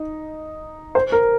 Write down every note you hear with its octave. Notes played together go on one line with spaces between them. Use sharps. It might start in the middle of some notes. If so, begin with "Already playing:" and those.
Already playing: D#4
C5
A#4